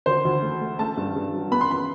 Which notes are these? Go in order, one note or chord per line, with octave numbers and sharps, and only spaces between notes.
D2 C5
D2
A3
A3
A3 A5
G2
G2
F#3
B3 B5
C6
B5